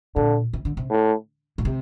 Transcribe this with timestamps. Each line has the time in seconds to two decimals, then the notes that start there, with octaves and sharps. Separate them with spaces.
0.16 A#2 D3
0.53 C3
0.65 D3
0.77 C3
0.90 A2
1.58 A#2
1.65 C3